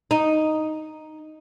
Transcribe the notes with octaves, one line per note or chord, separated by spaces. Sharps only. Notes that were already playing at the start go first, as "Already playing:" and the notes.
D#4